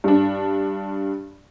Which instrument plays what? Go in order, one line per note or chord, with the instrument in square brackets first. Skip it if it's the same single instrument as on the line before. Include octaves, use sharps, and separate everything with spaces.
[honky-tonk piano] G2 D4